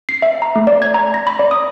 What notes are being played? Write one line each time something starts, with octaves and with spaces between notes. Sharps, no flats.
C7
E5
A#5
A3
D5
G#6
A#5
A#6
B5
D5
D#6